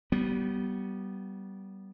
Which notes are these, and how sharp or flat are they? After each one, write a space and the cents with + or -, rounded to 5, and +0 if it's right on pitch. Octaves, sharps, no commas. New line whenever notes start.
G3 -25 B3 -15